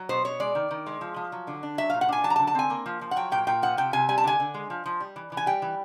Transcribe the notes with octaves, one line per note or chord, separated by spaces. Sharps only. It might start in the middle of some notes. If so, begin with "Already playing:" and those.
Already playing: F#3
B2 C5
B2 C#5
G#3 D5
D#3
D#3
G#3
F3
F3
F#3
D3
D4
F#3 E5
A#2 F5
F#5
D4 G#5
F#3 A5
A#5
A5
D3
A5
C4 G#5
A#3
F3
F3
F#5
F#3 G5
A#2 G5
A#2 G5
F3 F#5
C3 G5
C3 G#5
G3 G#5
A5
D3 G#5
D3
G#3
F3
F3
G3
E3
E3
G#5
G3 G5
E3